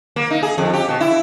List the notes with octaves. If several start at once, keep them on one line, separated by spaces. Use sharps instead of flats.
A#3
D#4
G#4
F2
G4
B2
E4